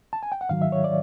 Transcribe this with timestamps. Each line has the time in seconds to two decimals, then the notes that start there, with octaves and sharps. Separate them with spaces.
0.13 A5
0.23 G#5
0.32 G5
0.41 F#5
0.49 G#2 D#3 F#3 F5
0.62 E5
0.72 C#5
0.84 D5